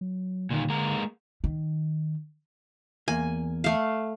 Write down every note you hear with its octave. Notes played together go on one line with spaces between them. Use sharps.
F#3
A#2 D3 D#3
G#3 A#3 A#5
D#3
E2 A#3 G#5
A3 F5